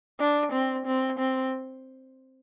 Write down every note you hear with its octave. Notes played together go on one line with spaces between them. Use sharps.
D4
C4
C4
C4